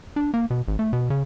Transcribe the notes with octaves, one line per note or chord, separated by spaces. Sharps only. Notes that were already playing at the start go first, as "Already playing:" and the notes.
D4
A#3
B2
G#1
A3
B2
C#3